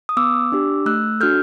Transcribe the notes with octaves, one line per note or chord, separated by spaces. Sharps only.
D#6
B3 D6 E6
D4 G4
A3 E6 F#6
D4 F#4 A4 F6 G6